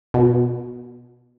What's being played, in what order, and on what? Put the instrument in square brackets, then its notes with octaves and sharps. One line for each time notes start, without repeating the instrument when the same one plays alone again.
[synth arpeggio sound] B2